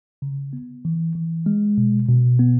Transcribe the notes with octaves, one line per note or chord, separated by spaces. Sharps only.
C#3
B3
E3
E3
G#3
B2
B2
B3